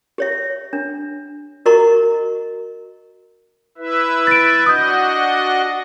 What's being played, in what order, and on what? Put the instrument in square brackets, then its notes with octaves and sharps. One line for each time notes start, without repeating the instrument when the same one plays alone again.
[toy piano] G4 C#5 E5
D4
F#4 A#4 D#5 A#5 C#6
[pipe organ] E4 B4 E5
[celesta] A6 D7
[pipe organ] D4 F#4 D#5 [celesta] D#6 G6